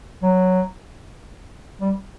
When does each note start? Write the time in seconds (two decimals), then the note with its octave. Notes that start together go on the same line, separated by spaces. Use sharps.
0.22 F#3
1.81 G3